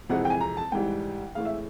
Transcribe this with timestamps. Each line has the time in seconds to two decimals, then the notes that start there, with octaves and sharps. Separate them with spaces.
0.09 F2 C3 E3 G#3 F#5
0.25 G5
0.30 G#5
0.40 A#5
0.57 A5
0.72 G#2 E3 G3 G5
1.35 A2 E3 G#3 F5
1.45 E5